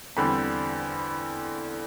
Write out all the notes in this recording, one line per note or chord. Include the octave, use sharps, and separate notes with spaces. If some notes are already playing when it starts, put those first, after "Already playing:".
E2 D3 G3 C4 B5